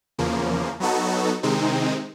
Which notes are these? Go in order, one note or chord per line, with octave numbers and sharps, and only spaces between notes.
E2 C#3 F3 A#3
F#3 B3 D#4 F#4 A4
C3 D#3 G#3 C4 D#4